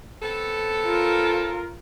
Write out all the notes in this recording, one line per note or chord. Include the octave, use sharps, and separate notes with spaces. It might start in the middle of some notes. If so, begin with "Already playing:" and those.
B3 C4 A4
F4 A#4